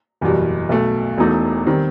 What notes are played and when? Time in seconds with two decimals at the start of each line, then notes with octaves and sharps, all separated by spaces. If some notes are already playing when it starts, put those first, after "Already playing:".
0.21 F#1 E2 B2 G3
0.69 B1 B2 A3
1.17 E1 E2 B2 A3 D#4
1.66 D#3 G3 C4